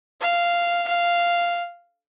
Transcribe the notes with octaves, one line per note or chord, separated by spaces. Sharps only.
F5
F5